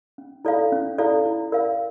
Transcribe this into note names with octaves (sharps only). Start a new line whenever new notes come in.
C#4
E4 A4 D5 F5
C#4
E4 A4 D5 F5
E4
A#4 D5 F5